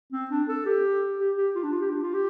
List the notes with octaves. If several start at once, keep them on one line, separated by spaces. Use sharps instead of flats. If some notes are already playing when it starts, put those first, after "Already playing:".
C4
D4
A4
G4
G4
G4
F4
D4
F4
G4
D4
F4
G4